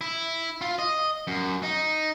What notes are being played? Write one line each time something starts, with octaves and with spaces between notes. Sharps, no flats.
E4
F4
D#5
F#2
D#4